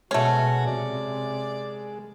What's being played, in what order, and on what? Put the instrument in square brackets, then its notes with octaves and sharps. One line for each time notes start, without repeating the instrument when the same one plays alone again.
[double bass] B2 [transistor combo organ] G#3 [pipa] A3 C#4 [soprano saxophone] F#4
[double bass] C3 [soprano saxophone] D5